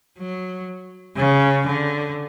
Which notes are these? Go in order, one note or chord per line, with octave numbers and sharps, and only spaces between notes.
F#3
C#3
D3